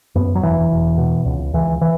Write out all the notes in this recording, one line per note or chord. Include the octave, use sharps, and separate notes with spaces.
F#2 B3
F#3
E1 E3
E1
B2
C#2
C#2 E3
E3